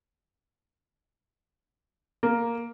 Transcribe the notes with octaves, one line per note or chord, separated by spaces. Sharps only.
A#3